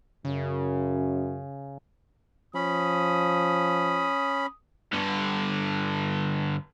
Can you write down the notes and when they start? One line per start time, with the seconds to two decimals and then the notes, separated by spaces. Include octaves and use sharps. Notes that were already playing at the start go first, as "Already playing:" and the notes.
0.25 F#2 C#3
2.55 F3 C#4 B5 D#6
4.93 G2 D3